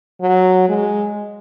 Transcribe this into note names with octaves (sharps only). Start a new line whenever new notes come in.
F#3
G#3